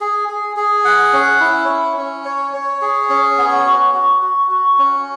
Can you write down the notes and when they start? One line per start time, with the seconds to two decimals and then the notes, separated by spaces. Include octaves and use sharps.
0.01 G#4
0.29 G#4
0.57 G#4
0.85 F#5
1.13 C#4
1.40 E4
1.69 C#4
1.97 C#4
2.25 C#5
2.54 C#5
2.82 G#4
3.09 C#4
3.38 B3
3.66 F#4
3.95 F#4
4.22 F#4
4.51 F#4
4.79 C#4